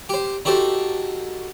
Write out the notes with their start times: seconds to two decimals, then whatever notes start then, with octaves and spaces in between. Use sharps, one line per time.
0.09 G4 C5
0.45 D#4 F#4 G4 A4 C5